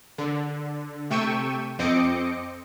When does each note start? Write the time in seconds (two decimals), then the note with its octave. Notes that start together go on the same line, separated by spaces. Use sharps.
0.18 D3
1.11 C3 A3 G5 C#6 E6 D#7
1.79 F2 C4 D#5 D6 C#7